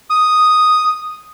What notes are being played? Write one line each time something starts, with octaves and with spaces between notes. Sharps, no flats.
D#6